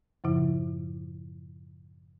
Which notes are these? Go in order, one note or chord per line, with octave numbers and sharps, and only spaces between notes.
F#2 A2 C#3 F3 E4